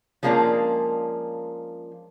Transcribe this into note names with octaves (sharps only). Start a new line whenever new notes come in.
F3 G#3 A#3 C#4 D4 F4